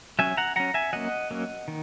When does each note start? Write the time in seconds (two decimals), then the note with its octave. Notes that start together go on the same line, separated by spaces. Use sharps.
0.19 F#3 C#4 E5 G#5
0.37 F#5 A#5
0.56 F#3 C#4 F#5 A#5
0.74 E5 G#5
0.93 F#3 A#3 C#4 D#5 F#5
1.31 F#3 A#3 C#4
1.68 D#3